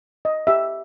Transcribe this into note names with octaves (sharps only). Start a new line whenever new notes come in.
D#5
G4 E5